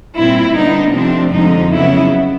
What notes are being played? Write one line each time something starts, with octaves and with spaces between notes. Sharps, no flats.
A#2 G3 C4 E4
D3 G3 B3 D4 D#4
C3 F3 A3 C4 D4
F2 D3 F3 G#3 D#4
C#3 F#3 B3 E4